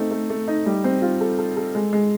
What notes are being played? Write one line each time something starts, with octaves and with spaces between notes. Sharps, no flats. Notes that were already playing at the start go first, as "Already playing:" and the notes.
Already playing: A3 C4 D#4
A3
A3
D#4
G3
C4
F4
A4
A4
A4
G#3
G#3